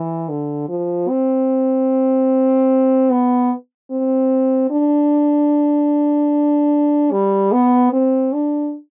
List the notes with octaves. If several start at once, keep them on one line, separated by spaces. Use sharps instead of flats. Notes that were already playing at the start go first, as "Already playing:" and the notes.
Already playing: E3
D3
F3
C4
B3
C4
D4
G3
B3
C4
D4